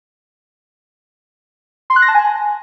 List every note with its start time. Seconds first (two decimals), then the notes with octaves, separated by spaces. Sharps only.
1.90 C6
1.96 F#6
2.02 A#6
2.08 A5
2.14 G#5